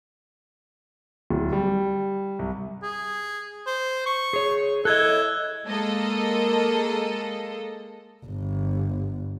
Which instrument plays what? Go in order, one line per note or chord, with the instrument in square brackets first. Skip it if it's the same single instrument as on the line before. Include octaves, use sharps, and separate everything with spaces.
[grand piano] D1
G3
C2
[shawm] G#4
C5
C#6
[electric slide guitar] G#4 C#5
[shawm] E4 [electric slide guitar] A4 D#5 [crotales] F#6 G#6 G7
[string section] G#3 A#3 A4 D#5
[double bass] G1